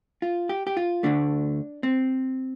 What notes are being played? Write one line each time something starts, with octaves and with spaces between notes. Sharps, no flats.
F4
G4
G4
F4
D2 D3 A3 D4
C4